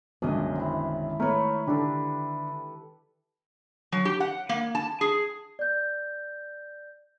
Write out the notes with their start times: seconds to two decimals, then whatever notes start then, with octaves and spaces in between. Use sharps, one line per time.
0.22 B1 F#2 D3 D#3 G#3 A#3 D4 D#5
0.55 C4 E4
1.20 A3 A#4 B4 C#5
1.67 D3 D4 G4 A4
3.92 F#3
4.05 G4
4.20 F#5
4.49 A#3
4.75 A5
5.01 G#4
5.59 D5 G6